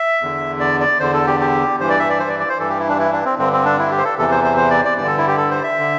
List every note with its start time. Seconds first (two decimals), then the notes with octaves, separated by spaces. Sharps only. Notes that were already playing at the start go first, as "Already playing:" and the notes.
Already playing: E5
0.21 E2 D3
0.60 D5
0.80 D5
1.00 E2 D3 C5
1.14 A4
1.27 G4
1.40 G4
1.80 G2 E3 C5
1.90 D5
1.99 E5
2.09 D5
2.20 C5
2.29 D5
2.40 D5
2.49 C5
2.59 G2 E3 A4
2.69 G4
2.79 E4
2.89 D4
2.99 E4
3.13 D4
3.25 C4
3.38 G2 D3 C4
3.53 C4
3.65 D4
3.79 E4
3.91 G4
3.98 C5
4.05 A4
4.18 E2 C3 E3 A4
4.32 C5
4.44 C5
4.57 C5
4.71 D5
4.85 D5
4.97 G2 D3 D5
5.07 A4
5.18 E4
5.28 G4
5.38 A4
5.51 C5
5.64 E5
5.79 D3